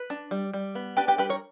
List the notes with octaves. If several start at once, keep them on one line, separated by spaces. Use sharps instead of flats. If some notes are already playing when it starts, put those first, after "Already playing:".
Already playing: B4
D4
G3
G3
B3
D4 G4 B4
G4 B4
G3 G4 B4
A#4 C#5